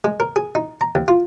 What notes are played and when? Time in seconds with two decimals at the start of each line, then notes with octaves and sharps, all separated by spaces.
0.04 G#3
0.20 A#4
0.36 G#4
0.55 D#4
0.81 A#5
0.95 D#2
1.08 F4